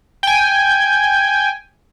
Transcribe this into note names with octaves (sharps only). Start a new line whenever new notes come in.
G5 G#5